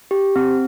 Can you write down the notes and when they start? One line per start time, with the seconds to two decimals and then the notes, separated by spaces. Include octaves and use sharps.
0.11 G4
0.36 C4